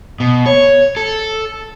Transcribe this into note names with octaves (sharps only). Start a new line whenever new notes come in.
B2
C#5
A4